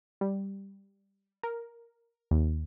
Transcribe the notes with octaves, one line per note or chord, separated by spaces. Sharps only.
G3
A#4
D#2